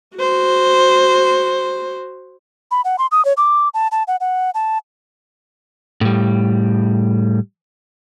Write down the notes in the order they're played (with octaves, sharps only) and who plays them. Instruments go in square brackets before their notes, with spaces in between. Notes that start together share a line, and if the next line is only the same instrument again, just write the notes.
[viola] F#4 C5
[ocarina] B5
F#5
C6
D#6
C#5
D6
A5
A5
F#5
F#5
A5
[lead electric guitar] A2 G3